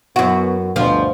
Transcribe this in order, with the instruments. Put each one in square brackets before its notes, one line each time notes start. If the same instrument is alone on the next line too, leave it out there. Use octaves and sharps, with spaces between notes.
[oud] F#2 F#4 [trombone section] B3
[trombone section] D2 G2 B2 [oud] F3